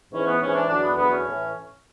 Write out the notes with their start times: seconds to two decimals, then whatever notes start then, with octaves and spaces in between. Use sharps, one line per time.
0.12 G#2 E3 C#4
0.26 B3
0.40 G#2 E3 C#4
0.54 D4
0.68 E2 D3 F#3 D4
0.83 B3
0.96 E2 D3 F#3 B3
1.10 C#4
1.25 A2 E3